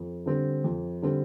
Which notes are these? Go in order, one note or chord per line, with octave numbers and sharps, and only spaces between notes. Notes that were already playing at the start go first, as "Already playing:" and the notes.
Already playing: F2
D3 G3 C4
F2
D3 G3 C4